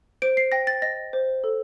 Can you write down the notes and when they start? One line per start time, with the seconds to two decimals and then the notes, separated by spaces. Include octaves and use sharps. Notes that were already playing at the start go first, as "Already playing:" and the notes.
0.22 C5 D7
0.37 C7
0.52 G5 A#6
0.67 A6
0.82 D#5 A#6
1.13 C5
1.44 A4